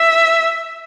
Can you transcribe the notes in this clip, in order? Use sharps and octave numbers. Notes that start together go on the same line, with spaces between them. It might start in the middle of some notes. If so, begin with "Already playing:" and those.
Already playing: E5